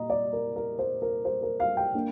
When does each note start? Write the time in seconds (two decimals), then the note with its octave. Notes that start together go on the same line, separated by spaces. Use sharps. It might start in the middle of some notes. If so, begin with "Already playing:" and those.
Already playing: A#2 D#5 A#5
0.10 D5
0.33 A#4
0.56 A#4
0.79 C5
1.02 A#4
1.25 C5
1.43 A#4
1.60 F5
1.77 G5
1.94 A#3 D4